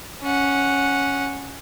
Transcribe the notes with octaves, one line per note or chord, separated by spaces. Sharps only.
C#4 F#5